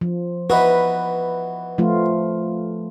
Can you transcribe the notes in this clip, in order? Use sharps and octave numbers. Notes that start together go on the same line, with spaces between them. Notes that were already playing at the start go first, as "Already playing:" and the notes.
F3
E3 D#4 F#4 B4
F3 A3 F4